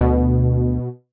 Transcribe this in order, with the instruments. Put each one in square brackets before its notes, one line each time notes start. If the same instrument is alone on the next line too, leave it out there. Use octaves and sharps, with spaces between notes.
[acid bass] D2 [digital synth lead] B2